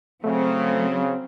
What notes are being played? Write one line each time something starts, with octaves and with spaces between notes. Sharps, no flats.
C#3 F#3 A3 C4